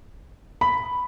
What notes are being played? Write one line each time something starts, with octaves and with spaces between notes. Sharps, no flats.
B5